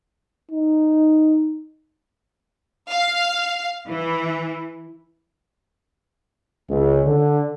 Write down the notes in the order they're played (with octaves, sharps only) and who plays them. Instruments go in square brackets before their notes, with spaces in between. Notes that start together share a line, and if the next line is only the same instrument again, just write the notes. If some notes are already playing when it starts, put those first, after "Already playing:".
[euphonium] D#4
[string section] F5
E3
[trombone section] C#2
D3